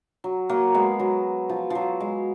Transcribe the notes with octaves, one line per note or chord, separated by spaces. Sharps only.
F#3
F#3 A#3
G#3 B3
F#3
F3
F3 F#3
G#3